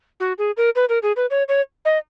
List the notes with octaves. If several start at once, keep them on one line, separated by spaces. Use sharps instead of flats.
F#4
G#4
A#4
B4
A#4
G#4
B4
C#5
C#5
D#5